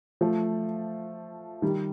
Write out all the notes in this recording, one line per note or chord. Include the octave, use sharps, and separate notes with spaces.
F3 A3
D#3 G3